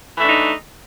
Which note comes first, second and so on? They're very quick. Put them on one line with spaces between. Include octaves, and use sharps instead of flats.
E3 A3 D4 D#4